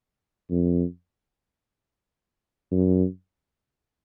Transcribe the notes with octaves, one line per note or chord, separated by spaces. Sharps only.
F2
F#2